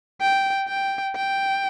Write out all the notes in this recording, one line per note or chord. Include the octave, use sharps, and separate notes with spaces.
G5
G5
G5